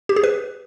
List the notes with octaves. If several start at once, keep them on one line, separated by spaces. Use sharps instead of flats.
G4
G#4
B4